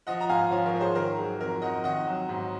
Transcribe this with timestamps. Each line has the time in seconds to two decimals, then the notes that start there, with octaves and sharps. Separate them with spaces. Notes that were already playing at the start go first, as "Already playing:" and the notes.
0.07 F3 D#5 F#5
0.21 A#5
0.29 G#2 F5 G#5
0.51 F3 C#5 F5
0.66 A#4 C#5
0.74 G#2
0.81 G#4 C5
0.95 D#3 A#4
1.18 F#3 G#4
1.41 F2 A#4
1.62 F2 D#5 F#5
1.84 D#3 D#5 F#5
2.07 F#3
2.29 G#2